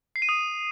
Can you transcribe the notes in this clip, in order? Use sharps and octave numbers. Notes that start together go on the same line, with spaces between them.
C7
D#7
D#6